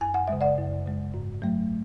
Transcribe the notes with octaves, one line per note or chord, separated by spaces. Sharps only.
F#2 G#5
F#5
C#3 G#3 E5
D5 F#5
F#2
C#3 G#3
G#2
F#3 A3